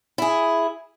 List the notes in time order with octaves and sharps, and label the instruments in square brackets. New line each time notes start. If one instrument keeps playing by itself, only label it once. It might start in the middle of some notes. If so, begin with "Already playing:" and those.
[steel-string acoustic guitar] E4 G#4